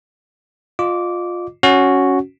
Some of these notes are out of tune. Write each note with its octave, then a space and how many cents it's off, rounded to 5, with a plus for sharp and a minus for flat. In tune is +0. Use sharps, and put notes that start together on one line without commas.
F4 +15 D#5 -30 D6 -15
C#4 +0 F#4 +0